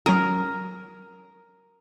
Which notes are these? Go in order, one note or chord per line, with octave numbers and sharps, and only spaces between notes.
F#3 C#4 A#4 D#6